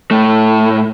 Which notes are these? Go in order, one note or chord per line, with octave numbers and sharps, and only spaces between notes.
A2 A3